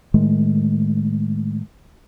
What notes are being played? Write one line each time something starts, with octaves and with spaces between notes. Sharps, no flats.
A2 D#3 G#3 A3